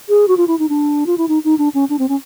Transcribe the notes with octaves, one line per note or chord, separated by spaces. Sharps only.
G#4
F#4
F4
E4
D#4
D4
F4
E4
D#4
D#4
D4
C#4
D4
C4
C#4